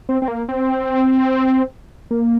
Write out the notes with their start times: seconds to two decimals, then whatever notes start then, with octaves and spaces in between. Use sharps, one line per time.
0.09 C4
0.22 C4
0.28 A#3
0.49 C4
2.11 A#3